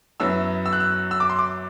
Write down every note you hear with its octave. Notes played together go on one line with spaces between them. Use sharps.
F#2 F#3 B3 E4 E6
E6
F#6
E6
E6
D6
C6
D6